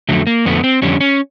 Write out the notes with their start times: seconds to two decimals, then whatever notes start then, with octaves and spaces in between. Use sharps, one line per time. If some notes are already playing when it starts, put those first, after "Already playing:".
0.09 F2 D3 F#3 A3
0.27 A#3
0.46 F2 D3 F#3 A3 B3
0.64 C4
0.82 F2 D3 G3 C#4
1.01 C#4